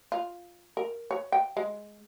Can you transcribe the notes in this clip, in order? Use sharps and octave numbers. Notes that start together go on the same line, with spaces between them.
F4
A#4
C#5
G5
G#3